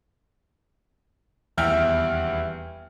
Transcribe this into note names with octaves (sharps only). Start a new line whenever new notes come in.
D#1 E2 E4 E5 G5 F6